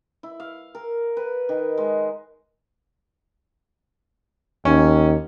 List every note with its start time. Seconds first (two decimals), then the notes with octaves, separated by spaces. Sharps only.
0.23 E4
0.40 F5
0.75 A#4
1.17 B4
1.49 D#3
1.78 G#3
4.65 D#2 C#4